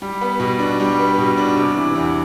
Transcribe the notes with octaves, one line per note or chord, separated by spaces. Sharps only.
G3
B3
B2
D4
G3
B3
B2
D4
C3
E3
E2